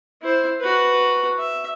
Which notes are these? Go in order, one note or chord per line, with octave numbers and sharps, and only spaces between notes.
E4 C5
F#4 B4
E5